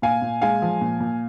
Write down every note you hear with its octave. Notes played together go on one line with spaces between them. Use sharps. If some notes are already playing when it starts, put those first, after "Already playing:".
A#2 F5 G#5
A#2
G#3 F5 G#5
F3
A#2
A#2